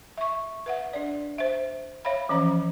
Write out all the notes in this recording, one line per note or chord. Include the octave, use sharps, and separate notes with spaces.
E5 C#6
B4 E5 F#5
D4 D5
C5 E5
C#5 E5 F5 B5
E3 F3 C#4 C5 A#5